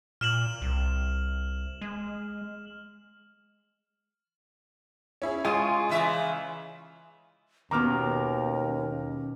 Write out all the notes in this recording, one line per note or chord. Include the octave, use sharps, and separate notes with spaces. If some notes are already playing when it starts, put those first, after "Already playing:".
A#2 F6 E7 F#7
C2
G#3
C#4 E4 G#4
G#3 F4 G#5 C#6 D#6
C#3 E3 E5
D#2 B2 D#3 C#4 A#5 D6 F6